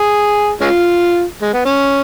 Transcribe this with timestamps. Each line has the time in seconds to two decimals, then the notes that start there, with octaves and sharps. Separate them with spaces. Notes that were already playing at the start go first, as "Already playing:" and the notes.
Already playing: G#4
0.61 G#3 C#4 F4
1.41 G#3
1.53 B3
1.65 C#4